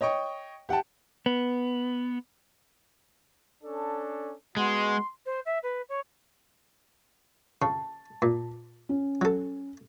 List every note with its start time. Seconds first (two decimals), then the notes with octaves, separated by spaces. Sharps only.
0.01 C#5 D#5 G5 C#6
0.69 G4 F#5 G5 A5
1.26 B3
3.63 C#4 D4 A4
4.57 G#3 B3 F#4 C6
5.26 C5
5.45 E5
5.63 B4
5.89 C#5
7.62 C#3 A5
8.22 A#2
8.89 C#4
9.21 F#3 A4